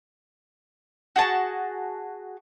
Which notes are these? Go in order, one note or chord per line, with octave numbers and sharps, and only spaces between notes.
F#4 G#4 A5